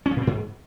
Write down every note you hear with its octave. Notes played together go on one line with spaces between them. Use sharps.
C#4
F3
A#2
C4
G#2